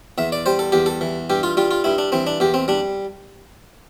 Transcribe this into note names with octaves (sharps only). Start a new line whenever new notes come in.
E2 E5
D5
G3 C5
A4
E2 G4
A4
E3
G2 G4
F4
G3 F4
F4
G2 E4
D4
E3 C4
D4
E2 G4
C4
G3 D4